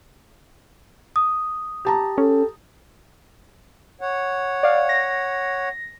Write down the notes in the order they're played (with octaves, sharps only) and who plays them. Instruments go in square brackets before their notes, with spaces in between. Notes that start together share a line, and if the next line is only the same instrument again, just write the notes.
[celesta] D#6
[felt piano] G4 A5 A#5
[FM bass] C#4 [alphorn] A4
[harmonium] C#5 F#5
[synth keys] D5 F5
A#6